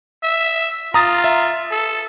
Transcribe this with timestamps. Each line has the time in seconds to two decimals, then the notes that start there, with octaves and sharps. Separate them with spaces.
0.24 E5
0.94 F4 A#5 D#6 A6
1.24 E5
1.71 A4